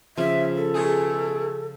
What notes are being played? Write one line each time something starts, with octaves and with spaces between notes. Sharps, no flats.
C#3 F3 E5
A4
B2 A3 G#4